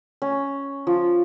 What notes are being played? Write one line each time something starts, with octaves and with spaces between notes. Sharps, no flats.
C#4
F3